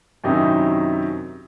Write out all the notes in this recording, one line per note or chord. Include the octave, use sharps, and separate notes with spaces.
F#2 C3 D#3 F#3 D#4 E4